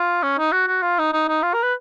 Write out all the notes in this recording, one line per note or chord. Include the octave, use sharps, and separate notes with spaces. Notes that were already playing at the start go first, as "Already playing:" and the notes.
Already playing: F4
C#4
D#4
F#4
F#4
F4
D#4
D#4
D#4
F4
A#4
B4